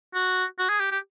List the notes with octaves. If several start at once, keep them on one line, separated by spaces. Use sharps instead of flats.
F#4
F#4
G#4
G4
G4